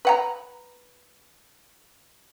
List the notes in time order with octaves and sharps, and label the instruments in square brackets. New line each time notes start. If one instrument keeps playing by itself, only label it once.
[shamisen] B4 F#5 A#5